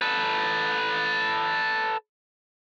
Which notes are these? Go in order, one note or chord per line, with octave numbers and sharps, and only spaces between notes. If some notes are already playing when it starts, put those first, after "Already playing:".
A4 B4